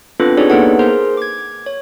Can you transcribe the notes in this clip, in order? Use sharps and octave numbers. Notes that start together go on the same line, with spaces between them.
B3 C4 D4 F4 A4 B4
D4 D#4 G4 G#4 C#5 D5
A#3 B3 D#4 A4 B4 F#5
G#4 A#4 C5 C6
D6 G#6
C#5